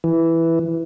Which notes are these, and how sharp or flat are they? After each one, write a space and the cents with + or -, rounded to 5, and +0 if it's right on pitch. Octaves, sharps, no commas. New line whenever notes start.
E3 +0